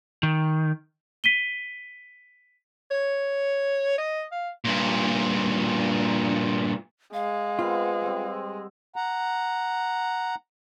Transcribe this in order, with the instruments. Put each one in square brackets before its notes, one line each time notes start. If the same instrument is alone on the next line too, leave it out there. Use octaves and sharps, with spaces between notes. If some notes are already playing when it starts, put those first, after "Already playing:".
[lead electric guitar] D#3
[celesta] B6 D#7 G7
[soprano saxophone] C#5
D#5
F5
[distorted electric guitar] G2 A#2
[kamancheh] G#3 [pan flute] F5
[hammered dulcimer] B3 C4 [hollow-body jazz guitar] F4
[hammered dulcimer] G3 C4
[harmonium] F#5 A#5